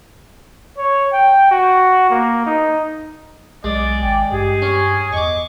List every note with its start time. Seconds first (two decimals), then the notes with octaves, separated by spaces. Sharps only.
0.77 C#5
1.12 G5
1.51 F#4
2.10 A#3
2.46 D#4
3.64 B1 G#3 D5
4.02 G#1 G5
4.32 G2 G4 G#4
4.62 C#4
5.13 E2 D#5 C#6 D6